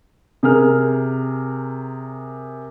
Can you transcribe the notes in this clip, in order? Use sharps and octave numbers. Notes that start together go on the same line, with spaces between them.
C3 G#4 A#4 F6